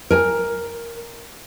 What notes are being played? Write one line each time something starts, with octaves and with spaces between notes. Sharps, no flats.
A#4 G#5